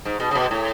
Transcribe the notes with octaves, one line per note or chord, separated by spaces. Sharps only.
G#2
B2
C#3
B2
A2